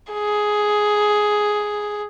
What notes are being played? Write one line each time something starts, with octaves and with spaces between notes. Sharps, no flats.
G#4